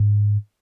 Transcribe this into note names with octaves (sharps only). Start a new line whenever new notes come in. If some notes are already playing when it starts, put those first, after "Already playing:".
Already playing: G#2